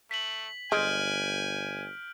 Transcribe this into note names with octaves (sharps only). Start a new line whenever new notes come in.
A3 B6 F#7
G1 G#3 G#5 F6 G6 D7